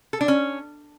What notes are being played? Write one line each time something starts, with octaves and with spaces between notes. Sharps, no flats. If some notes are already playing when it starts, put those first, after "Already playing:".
A4
D4
C#4